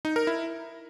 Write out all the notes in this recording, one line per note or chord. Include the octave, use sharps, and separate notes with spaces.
D#4
A#4
E4